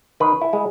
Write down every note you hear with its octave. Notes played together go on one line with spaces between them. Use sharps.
D#3 B4
E4
G#3